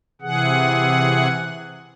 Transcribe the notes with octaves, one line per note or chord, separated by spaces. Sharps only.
C3 E3 G#4 F#5